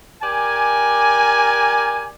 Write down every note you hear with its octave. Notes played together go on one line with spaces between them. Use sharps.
G4 A#4 D5 G#5